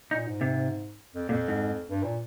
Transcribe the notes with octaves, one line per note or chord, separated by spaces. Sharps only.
A#2 D#4
G#2
C3
F2
F2 A#2
G#2
G2
A#2